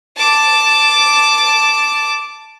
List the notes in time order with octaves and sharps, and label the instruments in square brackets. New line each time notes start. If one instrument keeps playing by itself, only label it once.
[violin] A5 D6